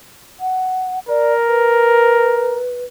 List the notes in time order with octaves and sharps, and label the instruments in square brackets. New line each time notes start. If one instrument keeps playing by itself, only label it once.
[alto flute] F#5
[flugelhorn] A#4 [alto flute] D5
[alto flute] B4